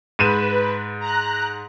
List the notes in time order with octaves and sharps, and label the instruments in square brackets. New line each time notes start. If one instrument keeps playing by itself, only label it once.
[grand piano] G#2 D#7 E7 [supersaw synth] B4
[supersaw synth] A#5 F#6